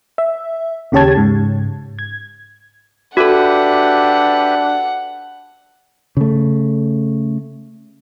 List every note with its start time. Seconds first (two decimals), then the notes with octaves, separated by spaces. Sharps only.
0.18 E5
0.92 D#2 C#3 G4 C#5 A5 G#6
1.15 G#2 C#3
1.99 G#6
3.17 D4 F#4 G4 A4 B4 E5 F#5
6.17 C#3 A3